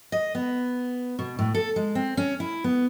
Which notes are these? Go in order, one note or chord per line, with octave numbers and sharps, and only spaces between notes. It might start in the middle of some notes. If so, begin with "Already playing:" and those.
D#5
B3
B2
A2
A4
G#3
C4
C#4
E4
B3